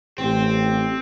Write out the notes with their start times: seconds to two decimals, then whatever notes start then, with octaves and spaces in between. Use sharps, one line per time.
0.18 A1 C4 G4